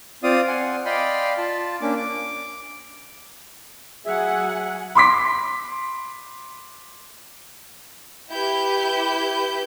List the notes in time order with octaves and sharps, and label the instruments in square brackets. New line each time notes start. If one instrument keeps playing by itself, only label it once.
[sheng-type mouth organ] C4 F4 D5 F5 D#6
F#5 G#5 C6
D5 D#5 F5 G5 B5 C6
F4 A5
A#3 C#4 D4 D6
D6
[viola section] F#3 F#5 G#5 [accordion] G#4 E5
[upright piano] B5 C6 D6 B6
[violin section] E4 G4 B4 G6